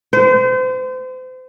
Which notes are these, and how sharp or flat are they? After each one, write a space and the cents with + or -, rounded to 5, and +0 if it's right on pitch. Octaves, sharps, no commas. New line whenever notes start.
C5 -35